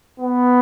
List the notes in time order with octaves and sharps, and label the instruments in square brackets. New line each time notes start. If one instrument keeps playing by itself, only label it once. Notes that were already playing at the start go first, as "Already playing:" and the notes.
[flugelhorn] B3